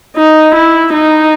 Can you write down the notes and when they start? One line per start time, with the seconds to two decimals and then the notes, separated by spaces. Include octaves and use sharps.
0.16 D#4
0.55 E4
0.93 D#4